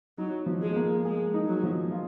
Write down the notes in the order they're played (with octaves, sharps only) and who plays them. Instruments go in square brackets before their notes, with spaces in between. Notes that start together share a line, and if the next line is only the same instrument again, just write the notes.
[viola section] F#3 [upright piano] D#4
[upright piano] F3
[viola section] G#3
[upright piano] A#3
[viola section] G#3 [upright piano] G#4
[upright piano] D#4
[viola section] F#3
[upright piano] F3
F4